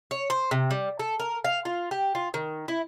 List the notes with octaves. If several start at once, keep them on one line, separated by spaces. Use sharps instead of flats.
C#5
C5
C3
G3
A4
A#4
F5
F4
G4
F4
D#3
E4